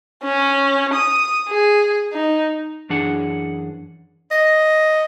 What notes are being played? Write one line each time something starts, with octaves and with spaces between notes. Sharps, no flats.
C#4
D#6
G#4
D#4
F#2 E3 D4 G#4 F#5
D#5